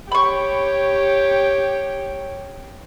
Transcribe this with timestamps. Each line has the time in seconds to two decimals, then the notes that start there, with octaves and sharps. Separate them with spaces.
0.12 G4 C#5 G5 B5 C#6